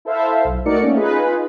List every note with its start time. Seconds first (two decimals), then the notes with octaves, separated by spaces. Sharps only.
0.05 E4 A4 C5 E5 F5
0.45 B1
0.66 A3 D#4 F#4 A#4 D5 C#7
0.83 A3 A#3 C#4
0.96 D#4 F4 G#4 B4